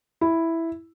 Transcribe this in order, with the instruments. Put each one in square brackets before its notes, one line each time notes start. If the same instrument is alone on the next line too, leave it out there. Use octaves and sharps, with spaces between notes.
[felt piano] E4